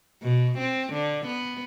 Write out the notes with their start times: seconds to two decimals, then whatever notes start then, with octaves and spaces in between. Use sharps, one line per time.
0.23 B2
0.59 C4
0.93 D3
1.26 B3